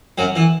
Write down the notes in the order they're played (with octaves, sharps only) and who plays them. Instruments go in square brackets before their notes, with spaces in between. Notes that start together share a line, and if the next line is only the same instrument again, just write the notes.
[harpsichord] F#2 F#3
E3